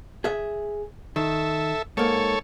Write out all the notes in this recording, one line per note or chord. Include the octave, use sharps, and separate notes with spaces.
G#4 E5
D#3 A4 E5
G#2 A#3 A4 C#5